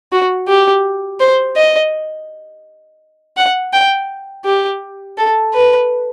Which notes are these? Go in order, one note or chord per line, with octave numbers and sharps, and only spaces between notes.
F#4
G4
C5
D#5
F#5
G5
G4
A4
B4